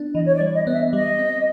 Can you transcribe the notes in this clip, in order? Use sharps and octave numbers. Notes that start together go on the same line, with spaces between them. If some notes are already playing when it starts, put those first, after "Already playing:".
Already playing: B3 D4
E3 D#5
C#5
D5
G3
D#5
B3 D#5
E5
G3 D#5
C4